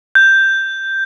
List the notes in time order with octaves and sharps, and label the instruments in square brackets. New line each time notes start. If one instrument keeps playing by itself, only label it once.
[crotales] G6